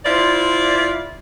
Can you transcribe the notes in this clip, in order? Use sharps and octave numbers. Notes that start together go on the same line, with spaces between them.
E4 F4 C5 D5